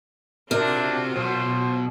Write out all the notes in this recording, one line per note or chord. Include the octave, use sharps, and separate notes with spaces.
C3 C4 D4 F4 F#4 A#4
B1 B2 C5